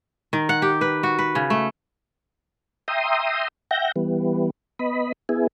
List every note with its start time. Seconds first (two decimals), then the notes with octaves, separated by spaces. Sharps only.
0.33 D#3
0.49 F#5
0.62 G4
0.81 B4
1.03 F#4
1.19 B4
1.35 C#3
1.50 A3
2.88 E5 G5 A#5 C6 D#6
3.71 E5 F#5 G5 G6 A#6
3.96 E3 G3 B3
4.79 B3 D#5 B5
5.29 B3 E4 G#4